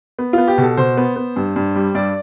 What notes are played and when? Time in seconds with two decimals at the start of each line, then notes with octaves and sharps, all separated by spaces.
0.19 B3
0.33 B3 F4
0.48 G4
0.58 B2 A4
0.77 B2 C5
0.97 B3
1.16 B3
1.36 G2
1.56 G2
1.76 G3
1.95 G2 D5